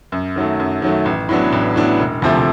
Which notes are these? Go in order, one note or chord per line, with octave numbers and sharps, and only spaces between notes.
F#2
D#3 F#3 A3
F#2
D#3 F#3 A3
A1
A2 F#3 B3 D4
A1
A2 F#3 B3 D4
E1
D2 C3 F3 A3